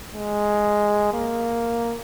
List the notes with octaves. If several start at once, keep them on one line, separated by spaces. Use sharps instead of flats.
G#3
A#3